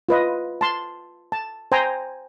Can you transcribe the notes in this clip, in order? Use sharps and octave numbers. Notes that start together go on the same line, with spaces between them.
F4 B4 D#5
A5 C6
A5
C5 G5 G#5 A#5